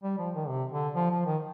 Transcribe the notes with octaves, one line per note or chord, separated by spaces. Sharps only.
G3
F3
D#3
C3
D3
F3
F3
D#3